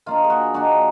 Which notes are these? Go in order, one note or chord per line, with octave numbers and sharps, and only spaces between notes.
D#3 A#3 D4 F4
G#4
F#4
D#3 A#3 D4 F#4